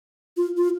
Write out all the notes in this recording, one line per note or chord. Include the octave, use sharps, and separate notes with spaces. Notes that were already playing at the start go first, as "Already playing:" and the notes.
F4
F4